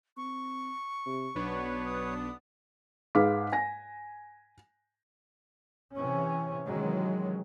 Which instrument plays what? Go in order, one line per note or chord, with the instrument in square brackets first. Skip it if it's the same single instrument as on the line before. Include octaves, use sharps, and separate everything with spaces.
[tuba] C4 [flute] C#6
[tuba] C3
[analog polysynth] B1 B3 D4 [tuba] F#3 [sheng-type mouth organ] B4 C#5
[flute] D#6
[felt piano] G#2 G#4 B4 F5 D6 B6
G#5 A#6
[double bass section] C3 E3 C#4
C3 D#3 E3 F#3 G#3 C#4